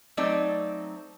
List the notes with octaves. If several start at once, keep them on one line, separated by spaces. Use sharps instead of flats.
F#3 A3 C4 D#4 D5